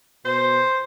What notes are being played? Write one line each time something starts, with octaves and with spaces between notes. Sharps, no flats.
B2 C5